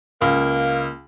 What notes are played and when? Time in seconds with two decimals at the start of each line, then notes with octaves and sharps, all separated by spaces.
0.21 C#2 A#3